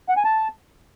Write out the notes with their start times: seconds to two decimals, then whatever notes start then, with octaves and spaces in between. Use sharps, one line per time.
0.09 F#5
0.17 G#5
0.25 A5